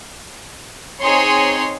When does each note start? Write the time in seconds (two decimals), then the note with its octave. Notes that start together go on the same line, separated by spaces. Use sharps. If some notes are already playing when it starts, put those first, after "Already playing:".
1.01 C4 D#4 G#4 C#5 C6